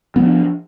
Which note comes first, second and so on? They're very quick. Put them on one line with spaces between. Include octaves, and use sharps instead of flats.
B3 F#3 F3 D4